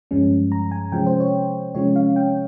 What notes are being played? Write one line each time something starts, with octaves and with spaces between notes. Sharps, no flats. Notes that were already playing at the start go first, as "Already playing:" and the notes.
G2 F3 G#3 C#4
A#5
G#5
C3 F3 G#3 C#4 G5
C5
C#5
C3 F3 G#3 C#4 C#5
F5
G5